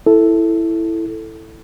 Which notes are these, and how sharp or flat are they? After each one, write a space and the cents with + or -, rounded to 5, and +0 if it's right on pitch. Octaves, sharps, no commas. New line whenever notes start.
E4 +0 A4 +0